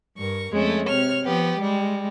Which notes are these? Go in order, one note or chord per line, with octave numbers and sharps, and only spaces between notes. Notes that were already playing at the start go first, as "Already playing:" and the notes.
G2 A#4 C#6
F2 G#3 A3 C#4
C3 C#5 F6
F3 B3 G4
G3 G#3